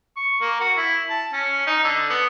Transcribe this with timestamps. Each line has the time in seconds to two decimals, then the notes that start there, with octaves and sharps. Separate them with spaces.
0.17 C#6
0.41 A#3
0.60 F#4
0.77 E4
1.10 A5
1.33 C#4
1.67 D#4
1.84 D3
2.10 B3